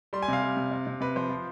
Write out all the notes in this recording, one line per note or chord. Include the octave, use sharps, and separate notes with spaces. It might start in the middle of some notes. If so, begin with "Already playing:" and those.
G3 C6
G#5
C3 F5
G3
C3
C3
C3
C3 B4
F3 C5
F3